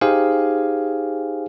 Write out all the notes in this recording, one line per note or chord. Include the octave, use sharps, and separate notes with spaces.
D#4 G4 G#4 C5 F5 G#5